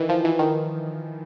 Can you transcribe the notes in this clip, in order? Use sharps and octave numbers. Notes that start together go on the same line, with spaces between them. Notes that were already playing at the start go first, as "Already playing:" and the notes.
Already playing: D#3 E3
F3
E3
D#3